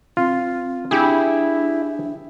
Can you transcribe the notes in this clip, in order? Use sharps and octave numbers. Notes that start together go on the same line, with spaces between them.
C4 F4
D4 E4 G4 G#4